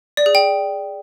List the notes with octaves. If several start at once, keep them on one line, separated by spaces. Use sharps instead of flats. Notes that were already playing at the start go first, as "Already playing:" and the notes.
D5
G#4
G5